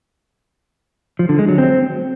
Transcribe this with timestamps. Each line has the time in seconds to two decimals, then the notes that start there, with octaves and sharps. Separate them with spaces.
1.19 F3
1.29 D3
1.39 G#3
1.49 F#3
1.58 C4